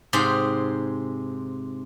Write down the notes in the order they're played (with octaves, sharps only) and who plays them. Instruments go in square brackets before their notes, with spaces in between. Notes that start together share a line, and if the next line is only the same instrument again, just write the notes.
[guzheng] G#2 C3 G#4 C5